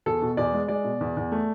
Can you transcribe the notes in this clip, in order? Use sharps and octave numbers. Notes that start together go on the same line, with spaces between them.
E2 A4
B2
E2 D5
G#3
G#3 D5
B2
E2
E2
A3